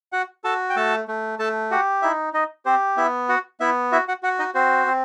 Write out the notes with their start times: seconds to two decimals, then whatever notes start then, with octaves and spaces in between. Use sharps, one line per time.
0.12 F#4 F#5
0.44 F#4 A4 A5
0.70 G5
0.76 A3 A4 A5
1.08 A3
1.39 A3 A4 A5
1.71 F#4 G4 F#5
2.02 D#4 E4 E5
2.33 D#4 D#5
2.66 C4 G4 C5
2.97 B3 E4 E5
3.29 F#4 F#5
3.60 B3 E4 E5
3.92 E4 F#4 E5
4.08 F#4 F#5
4.23 F#4 F#5
4.39 D#4 D#5
4.55 C4 F#4 C5
4.87 C4